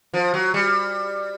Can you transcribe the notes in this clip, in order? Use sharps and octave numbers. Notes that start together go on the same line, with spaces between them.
F3
F#3
G3